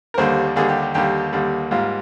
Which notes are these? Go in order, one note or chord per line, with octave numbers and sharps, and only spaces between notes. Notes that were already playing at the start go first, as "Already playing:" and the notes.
A#4
D#2 D3 G3 A#3 C5
D#2 D3 G3 A#3 G#4
G4
G4
D#2 D3 G3 A#3 G4
D#2 D3 G3 A#3
G#2 G3 A#3 F4